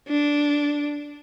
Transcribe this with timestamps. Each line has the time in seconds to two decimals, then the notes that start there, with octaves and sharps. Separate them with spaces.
0.08 D4